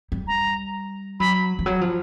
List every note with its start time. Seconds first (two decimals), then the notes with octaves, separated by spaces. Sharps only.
0.12 G3
0.27 A#5
1.20 F#3 B5
1.59 F3
1.66 F#3
1.81 F3